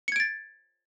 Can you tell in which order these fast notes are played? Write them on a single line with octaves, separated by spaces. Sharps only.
C#7 G#6 D7 A6